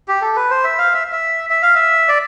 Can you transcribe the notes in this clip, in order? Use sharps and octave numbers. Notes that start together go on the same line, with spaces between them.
G4
A4
B4
C5
E5
F5
E5
E5
E5
F5
E5
D5